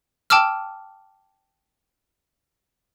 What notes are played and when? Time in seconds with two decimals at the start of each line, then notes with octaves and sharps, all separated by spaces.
0.30 G5 A5 D6 E6 F6